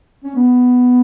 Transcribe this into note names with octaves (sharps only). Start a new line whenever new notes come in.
C#4
B3